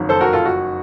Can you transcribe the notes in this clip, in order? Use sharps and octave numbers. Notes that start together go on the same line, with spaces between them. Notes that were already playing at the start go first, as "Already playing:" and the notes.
Already playing: F#1 F2 D#3 F#3
A4 C5
F#4 A#4
F4 A4
F#4